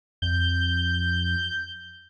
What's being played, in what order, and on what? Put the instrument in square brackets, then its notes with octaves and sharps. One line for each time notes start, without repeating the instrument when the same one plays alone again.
[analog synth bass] F2 [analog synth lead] G6